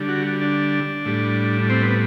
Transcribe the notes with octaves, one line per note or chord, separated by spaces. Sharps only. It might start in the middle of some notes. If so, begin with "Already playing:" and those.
Already playing: D3 G3
F#4
D4
A2 G3
C4
B3